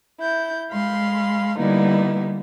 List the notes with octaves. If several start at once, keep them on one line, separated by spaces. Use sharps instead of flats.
E4 G6
G#3 F5 B5 C6
D3 G3 A#3 B3 D#4 E4